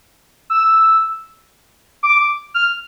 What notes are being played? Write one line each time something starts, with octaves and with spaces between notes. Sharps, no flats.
E6
D6
F6